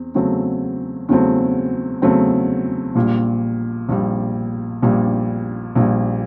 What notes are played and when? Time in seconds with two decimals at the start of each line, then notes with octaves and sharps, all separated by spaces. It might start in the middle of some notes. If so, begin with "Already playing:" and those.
Already playing: E2 C4
0.15 E2 C#3 F#3 A3 C4
1.09 E2 C#3 F#3 A3 C4
2.02 E2 C#3 F#3 A3 C4
2.95 A#1 A#2 G3
3.89 A#1 A#2 G3
4.82 A#1 A#2 G3
5.75 A#1 A#2 G3